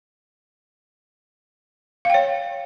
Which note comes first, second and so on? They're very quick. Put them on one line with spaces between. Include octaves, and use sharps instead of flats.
F5 G5 C#5